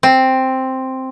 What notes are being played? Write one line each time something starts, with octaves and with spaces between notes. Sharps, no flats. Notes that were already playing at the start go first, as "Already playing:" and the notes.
C4